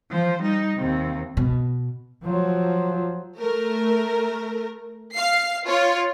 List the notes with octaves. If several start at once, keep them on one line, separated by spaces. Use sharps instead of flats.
F3 C5
G3 D#4
D#2 C3
B2
F3 F#3
A3 A#4
F5 C7
F4 C#5